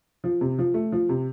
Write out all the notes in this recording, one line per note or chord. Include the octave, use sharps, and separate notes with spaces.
F3
C3
F3
A3
F3
C3